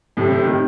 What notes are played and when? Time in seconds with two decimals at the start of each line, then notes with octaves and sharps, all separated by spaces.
0.17 A2 C3
0.31 A2 C3
0.45 C3 D#3